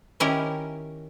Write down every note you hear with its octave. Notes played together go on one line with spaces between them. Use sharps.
D#3 C#4 E4 G4 A#4